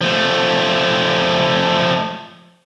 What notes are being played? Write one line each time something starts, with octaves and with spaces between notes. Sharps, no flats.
F3 A3